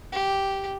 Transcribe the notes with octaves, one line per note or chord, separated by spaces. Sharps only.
G4